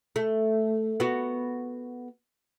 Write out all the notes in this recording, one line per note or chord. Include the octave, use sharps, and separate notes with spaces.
A3
B3 F#4